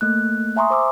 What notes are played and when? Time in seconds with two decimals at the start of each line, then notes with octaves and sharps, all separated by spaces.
0.01 A3 A#3 F#6
0.56 E5 G#5 A#5 C6 C#6 D#6
0.71 C5 D6 E6